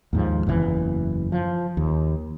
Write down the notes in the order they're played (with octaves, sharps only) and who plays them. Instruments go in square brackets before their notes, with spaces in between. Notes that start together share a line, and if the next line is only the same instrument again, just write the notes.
[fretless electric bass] D#2 G#2 F3
F#1 E2 G2 E3
F3
D#2